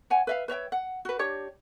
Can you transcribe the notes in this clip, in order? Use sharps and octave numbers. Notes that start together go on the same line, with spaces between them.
C#5 F#5 G#5
B4 E5 F5
B4 C#5 E5 G5
F#5
F#4 B4
D4 G4 C#5